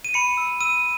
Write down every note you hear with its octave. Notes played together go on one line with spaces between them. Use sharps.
D#7
B5 C#7
E6
E6 D#7